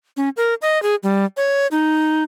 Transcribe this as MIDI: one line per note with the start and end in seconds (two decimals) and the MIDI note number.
0.17 0.29 61
0.37 0.54 70
0.62 0.81 75
0.83 0.95 68
1.03 1.25 55
1.37 1.67 73
1.71 2.23 63